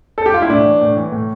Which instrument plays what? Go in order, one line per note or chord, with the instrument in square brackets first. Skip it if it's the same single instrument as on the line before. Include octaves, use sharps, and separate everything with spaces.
[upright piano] A4
G4
F4
E4
A2 D4
E3
A2
E3
A2